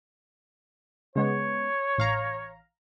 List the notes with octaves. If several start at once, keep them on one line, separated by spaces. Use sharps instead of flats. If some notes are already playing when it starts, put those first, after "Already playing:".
C#3 G#3 B3 C#5
A1 F5 A#5